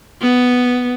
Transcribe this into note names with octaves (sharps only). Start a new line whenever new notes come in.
B3